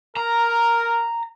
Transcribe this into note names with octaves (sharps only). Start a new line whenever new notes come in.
A#4 A#5